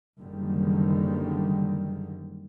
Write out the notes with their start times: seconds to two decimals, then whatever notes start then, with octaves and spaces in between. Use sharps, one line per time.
0.20 F#1 F#2 D3 D#3 G3